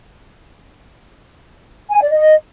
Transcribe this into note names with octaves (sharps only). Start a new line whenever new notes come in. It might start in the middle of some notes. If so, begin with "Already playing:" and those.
G#5
D5
D#5